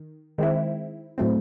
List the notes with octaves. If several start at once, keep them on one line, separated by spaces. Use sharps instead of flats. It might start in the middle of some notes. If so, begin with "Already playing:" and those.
Already playing: D#3
D#3 G#3 C4 E4
A2 F#3 A3 C4